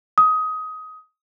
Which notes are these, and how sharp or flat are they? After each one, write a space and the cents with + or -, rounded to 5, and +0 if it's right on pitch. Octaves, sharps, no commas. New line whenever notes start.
D#6 +20